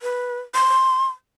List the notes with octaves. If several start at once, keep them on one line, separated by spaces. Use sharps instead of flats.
B4
C6